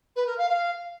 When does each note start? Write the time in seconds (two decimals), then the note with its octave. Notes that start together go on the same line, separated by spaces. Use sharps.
0.16 B4
0.27 A#4
0.38 F5
0.49 F5